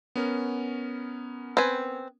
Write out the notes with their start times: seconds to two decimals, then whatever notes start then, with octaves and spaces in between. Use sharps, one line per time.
0.16 B3 C#4 A#4
1.57 C4 B4 G#5